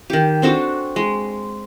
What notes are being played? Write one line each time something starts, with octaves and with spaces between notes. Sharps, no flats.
D#3 G4
C4 D4 F#4 A4
G#3